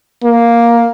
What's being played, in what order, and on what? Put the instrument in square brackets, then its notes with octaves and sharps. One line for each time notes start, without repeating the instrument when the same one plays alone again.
[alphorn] A#3